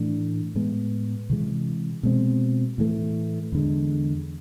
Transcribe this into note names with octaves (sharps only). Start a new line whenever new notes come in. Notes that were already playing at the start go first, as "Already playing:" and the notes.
Already playing: A2 E3 A3 D4
A2 G#3 B3
C3 E3 G#3
B2 G#3 C4
A2 E3 A3
E2 D3 G#3